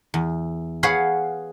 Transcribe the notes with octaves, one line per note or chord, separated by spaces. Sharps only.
E2
G#4 B4 C#5 F5 F#5